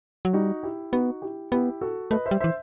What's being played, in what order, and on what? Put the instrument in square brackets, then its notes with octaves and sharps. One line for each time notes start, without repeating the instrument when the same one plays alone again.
[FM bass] F#3
[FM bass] G3 [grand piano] D#4 F#4
[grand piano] E4 G4
[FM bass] B3 [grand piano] D#4 F#4
[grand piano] E4 G4
[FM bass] B3 [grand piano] E4 G4
[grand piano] F#4 A4
[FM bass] A3 [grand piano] B4 D#5
[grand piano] C5 E5
[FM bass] G3
[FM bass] E3 [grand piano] C5 E5